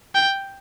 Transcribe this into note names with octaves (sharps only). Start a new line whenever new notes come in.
G5